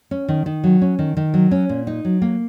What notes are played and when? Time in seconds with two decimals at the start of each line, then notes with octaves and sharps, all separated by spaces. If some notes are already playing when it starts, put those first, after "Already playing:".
0.11 C#4
0.28 D#3
0.46 D#3
0.64 F#3
0.82 C#4
0.99 D#3
1.17 D#3
1.34 F#3
1.51 C#4
1.69 A#2
1.87 D#4
2.05 F#3
2.22 A#3